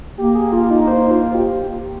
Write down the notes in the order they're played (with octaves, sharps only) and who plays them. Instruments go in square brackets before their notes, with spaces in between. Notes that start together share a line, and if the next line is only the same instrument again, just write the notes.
[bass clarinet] A#3 [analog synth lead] G4
[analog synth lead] G#4
F4
D#4
C5
F4
G4